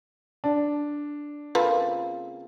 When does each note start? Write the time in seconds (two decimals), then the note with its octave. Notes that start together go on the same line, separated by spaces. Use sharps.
0.44 D4
1.55 C#3 A#3 C4 F4 A4 B4